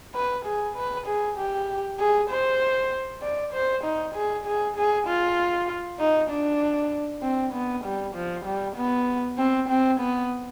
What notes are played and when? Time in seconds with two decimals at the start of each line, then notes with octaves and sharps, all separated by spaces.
0.15 B4
0.45 G#4
0.76 B4
1.07 G#4
1.37 G4
1.99 G#4
2.30 C5
3.22 D5
3.53 C5
3.84 D#4
4.14 G#4
4.46 G#4
4.76 G#4
5.07 F4
5.99 D#4
6.30 D4
7.22 C4
7.53 B3
7.84 G3
8.15 F3
8.46 G3
8.76 B3
9.38 C4
9.69 C4
10.00 B3